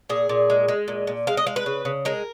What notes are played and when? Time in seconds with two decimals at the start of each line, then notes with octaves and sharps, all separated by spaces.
0.09 A#2 G#4
0.29 A#2
0.50 G#3
0.68 G#3
0.88 A#2
1.07 A#2
1.27 G#3 F5
1.37 D#5
1.47 G#3 F5
1.56 B4
1.66 C#3
1.85 C#3
2.05 G#3 A#4